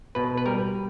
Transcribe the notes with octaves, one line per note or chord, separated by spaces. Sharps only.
B2 B4
B4
G3 A#4